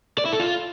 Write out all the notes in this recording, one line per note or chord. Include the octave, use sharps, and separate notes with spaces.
D5
E4
A4
F4